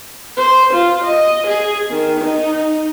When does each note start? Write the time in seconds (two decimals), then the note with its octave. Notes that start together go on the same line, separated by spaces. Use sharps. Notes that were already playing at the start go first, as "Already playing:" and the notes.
0.37 C5
0.73 F4
1.03 D#5
1.47 G#4
1.90 D#3
2.24 D#4